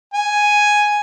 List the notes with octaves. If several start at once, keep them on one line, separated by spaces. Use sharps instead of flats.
G#5